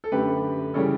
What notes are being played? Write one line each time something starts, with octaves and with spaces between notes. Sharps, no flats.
A4
F#2 D3 A3 G4 B4
C#3 E3 G3 A4 C#5